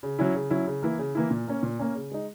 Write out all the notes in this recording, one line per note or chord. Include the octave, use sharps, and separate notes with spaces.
C#3
F#3 C#4 E4
C#3
F#3 C#4 E4
C#3
E3 A#3 E4
C#3
E3 A#3 E4
A#2
A#3 C#4
A#2
A#3 C#4
C#3
G#3 D#4